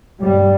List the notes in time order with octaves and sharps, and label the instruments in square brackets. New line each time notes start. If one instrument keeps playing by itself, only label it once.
[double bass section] G2 G3